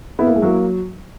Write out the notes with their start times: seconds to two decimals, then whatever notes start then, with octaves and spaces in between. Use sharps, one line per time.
0.19 B3 E4
0.27 A#3
0.36 G#3
0.42 F#3 A#3